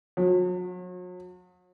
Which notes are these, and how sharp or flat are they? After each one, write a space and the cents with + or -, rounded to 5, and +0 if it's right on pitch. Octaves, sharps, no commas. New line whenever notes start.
F#3 -40